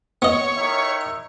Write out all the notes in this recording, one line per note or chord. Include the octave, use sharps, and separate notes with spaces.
B3 C#5 D#5
D#3 E4